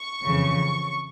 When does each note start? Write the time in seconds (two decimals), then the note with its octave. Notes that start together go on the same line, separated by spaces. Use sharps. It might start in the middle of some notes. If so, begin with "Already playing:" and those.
Already playing: C#6
0.24 F2 C#3 E3